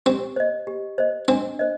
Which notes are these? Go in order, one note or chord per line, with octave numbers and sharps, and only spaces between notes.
C4 G4
C5 D#5
G4
C5 D#5
C4 D4
C5 D#5